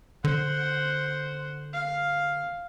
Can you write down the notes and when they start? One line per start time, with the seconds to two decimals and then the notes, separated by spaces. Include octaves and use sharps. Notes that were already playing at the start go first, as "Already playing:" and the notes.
0.24 D3 C5 F#5
1.73 F5